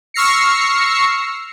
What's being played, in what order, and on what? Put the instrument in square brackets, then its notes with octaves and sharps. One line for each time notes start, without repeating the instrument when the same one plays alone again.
[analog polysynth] C#6 E6 F6 A#6 C7 C#7